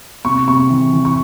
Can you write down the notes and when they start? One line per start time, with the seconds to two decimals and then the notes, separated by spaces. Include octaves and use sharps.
0.25 C3 C#6
0.48 C3 C#6
0.70 E3
0.93 E3
1.05 C#6